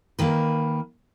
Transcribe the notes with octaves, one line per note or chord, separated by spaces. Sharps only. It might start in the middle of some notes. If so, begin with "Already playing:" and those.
D#3 A#3 B4